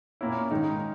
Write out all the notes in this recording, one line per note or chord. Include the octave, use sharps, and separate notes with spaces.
A#2 A#3 C#4 E4
G#2 D#3 G#3 D#4